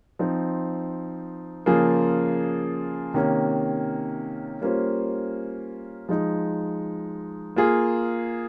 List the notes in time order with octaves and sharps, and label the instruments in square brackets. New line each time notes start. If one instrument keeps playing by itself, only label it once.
[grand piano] F3 C4 D#4
C#3 F3 A#3 F4 G#4
C3 D#3 A#3 C#4
G3 A#3 C#4 F4 C5
F3 G#3 D#4
A#3 F4 G#4